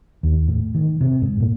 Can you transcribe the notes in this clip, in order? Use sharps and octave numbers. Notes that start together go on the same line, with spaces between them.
D#2
A2
D#3
C3
G#2
A#2